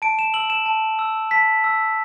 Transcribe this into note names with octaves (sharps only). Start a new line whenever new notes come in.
A5 D7
E7
E6 F#7
E7
A5
E6
A5 B6
E6